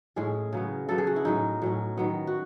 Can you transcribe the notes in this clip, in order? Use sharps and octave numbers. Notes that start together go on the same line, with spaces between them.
A2 G#3 C#4 G#4
C#3 F#3 B3
C#3 F#3 B3 A4
G#4
F#4
E4
A2 F#3 C#4 D#4
A2 F#3 C#4
D#3 F#3 B3
F#4